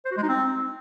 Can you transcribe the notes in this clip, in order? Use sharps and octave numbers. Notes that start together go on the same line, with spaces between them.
C5
F#4
G#3
D#4
C4